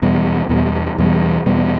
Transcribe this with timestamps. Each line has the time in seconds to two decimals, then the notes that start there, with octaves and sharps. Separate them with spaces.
0.02 E2 B2 G3
0.49 E2 B2 G3
0.98 E2 B2 G3
1.46 E2 B2 G3